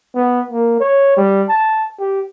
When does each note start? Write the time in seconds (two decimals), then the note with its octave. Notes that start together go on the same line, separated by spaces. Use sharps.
0.15 B3
0.51 A#3
0.80 C#5
1.17 G3
1.49 A5
2.00 G4